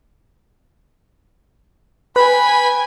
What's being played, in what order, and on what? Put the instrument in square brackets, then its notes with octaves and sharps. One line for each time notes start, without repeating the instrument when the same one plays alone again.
[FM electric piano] B4 [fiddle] G5 G#5 [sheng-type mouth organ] B5